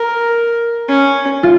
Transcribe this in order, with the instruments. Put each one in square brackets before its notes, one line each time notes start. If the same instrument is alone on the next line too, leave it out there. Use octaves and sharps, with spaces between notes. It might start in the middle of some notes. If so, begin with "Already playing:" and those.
Already playing: [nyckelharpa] A#4
C#4
[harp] F4